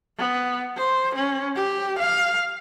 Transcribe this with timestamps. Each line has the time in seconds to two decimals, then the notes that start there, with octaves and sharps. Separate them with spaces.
0.18 B3
0.77 C5
1.16 C#4
1.56 G4
1.99 F5